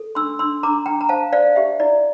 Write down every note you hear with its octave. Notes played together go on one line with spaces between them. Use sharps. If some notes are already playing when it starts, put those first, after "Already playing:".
Already playing: A4
D4 C6 E6
D4 C6 E6
D4 A#5 D6
D4 G5 A#5
A#5
C5 F5 A5
C5 D5 F5
G4 E5
E4 D5